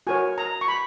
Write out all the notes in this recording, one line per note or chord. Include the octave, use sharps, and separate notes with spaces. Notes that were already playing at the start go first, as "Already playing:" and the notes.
F#4 A#4 C#5 G#5
A#5
C#6
B5